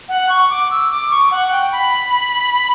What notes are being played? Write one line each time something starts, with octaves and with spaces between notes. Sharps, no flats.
F#5
C#6
D6
E6
D6
C#6
F#5
G5
B5